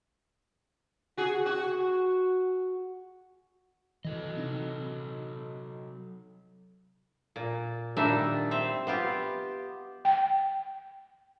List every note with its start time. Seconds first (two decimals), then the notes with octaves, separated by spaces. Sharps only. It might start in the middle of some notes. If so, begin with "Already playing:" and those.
1.17 F#4 G#4
1.46 F#4
4.04 E3 F#3 A4 D#5
4.36 C3 D#4
7.36 A#2
7.97 A#2 D#3 G3 D4 D#4 E5
8.51 C4 E5
8.87 B3 F4 G4
10.05 G5